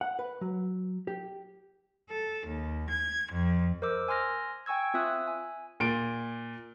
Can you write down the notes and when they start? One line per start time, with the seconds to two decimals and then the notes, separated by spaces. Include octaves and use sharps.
0.01 F#5
0.19 B4
0.41 F#3
1.07 G4
2.09 A4
2.47 D#2
2.89 G#6
3.31 F2
3.82 A#4 C5 D#5 D6 E6
4.08 G#5 C6 F6 A#6
4.66 G5 G#5 C#6 E6 G#6
4.94 C4 F4 E5 D#6 E6 F#6
5.27 G#5
5.80 A#2 D7